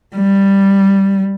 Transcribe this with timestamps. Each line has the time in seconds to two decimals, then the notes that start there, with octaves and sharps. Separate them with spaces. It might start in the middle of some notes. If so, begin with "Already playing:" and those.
0.15 G3